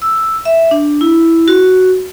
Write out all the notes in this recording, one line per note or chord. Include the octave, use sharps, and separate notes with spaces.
E6
E5
D4
E4
F#4